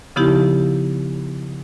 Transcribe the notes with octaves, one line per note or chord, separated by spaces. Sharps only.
C#3 F3 B3 D#4 E4 G4